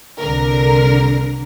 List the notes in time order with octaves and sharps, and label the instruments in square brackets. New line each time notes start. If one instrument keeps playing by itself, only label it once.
[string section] C2 D3 A#4